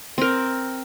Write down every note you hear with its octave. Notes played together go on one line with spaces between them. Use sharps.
C4 A#4